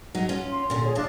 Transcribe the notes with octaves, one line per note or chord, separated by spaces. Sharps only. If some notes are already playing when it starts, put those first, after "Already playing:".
F#3 D#4
C#4 F4
C6
A#2 D3
G#4 C#5
E3 D4 F5 A5